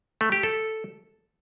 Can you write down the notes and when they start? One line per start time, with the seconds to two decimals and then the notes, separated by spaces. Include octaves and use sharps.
0.21 A3
0.32 G4
0.43 A4